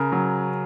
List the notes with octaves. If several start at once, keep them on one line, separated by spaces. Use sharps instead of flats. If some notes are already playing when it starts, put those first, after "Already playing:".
Already playing: C#3 A#4
F#3